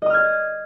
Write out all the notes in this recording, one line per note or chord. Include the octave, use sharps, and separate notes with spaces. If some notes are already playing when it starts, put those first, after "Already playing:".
D#5 D#6 F6 G#6